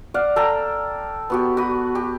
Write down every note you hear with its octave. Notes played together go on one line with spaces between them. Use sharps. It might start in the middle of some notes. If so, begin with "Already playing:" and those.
D5 F5 F#5
A4 G5 A#5
B3 F#4 G4
F#4 B5 D#6
G4